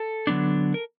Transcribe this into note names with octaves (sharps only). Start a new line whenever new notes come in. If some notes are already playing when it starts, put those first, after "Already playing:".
Already playing: A4
D3 F#3 B3 D4
A#4